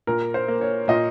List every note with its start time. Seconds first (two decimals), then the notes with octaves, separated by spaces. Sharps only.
0.07 A#2 A#4
0.34 C5
0.48 A#3
0.61 C#5
0.88 A#2 D#5